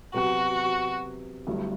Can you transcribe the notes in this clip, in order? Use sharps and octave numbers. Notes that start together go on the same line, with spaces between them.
C3 F#3 B3 F#4
G1 G2 F#3 A3 E4